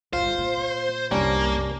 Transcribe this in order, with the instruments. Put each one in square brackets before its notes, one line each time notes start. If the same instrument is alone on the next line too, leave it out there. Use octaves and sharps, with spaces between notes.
[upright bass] G1 E2 [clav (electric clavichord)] F4 [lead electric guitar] C5
[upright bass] A#2
[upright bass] C2 F#2 [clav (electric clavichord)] G3 C#4 D4 [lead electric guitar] A#3